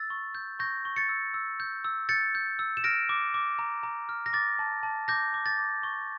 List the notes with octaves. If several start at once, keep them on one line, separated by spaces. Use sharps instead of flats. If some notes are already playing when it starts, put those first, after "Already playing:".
Already playing: E6 A6
C#6
G6
C#6 G6 A#6
C#6
A6 C#7
E6
E6
G6
E6
G6 A6 C#7
G6
E6
E7
F6 A#6 D7
D6
D6
A#5
A#5
F6
A#6
D6 A6
A5
A5
D6 G6 A#6
D6
A6
D6
C#6